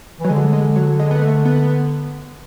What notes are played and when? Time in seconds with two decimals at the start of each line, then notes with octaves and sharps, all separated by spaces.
0.20 E3 F#3
0.30 D3 G#3
0.53 G#3
0.76 F#3
1.00 G#3
1.11 B3
1.22 A3
1.45 B3